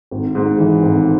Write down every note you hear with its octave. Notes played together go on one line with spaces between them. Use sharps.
G#1
G#2
E3
G#1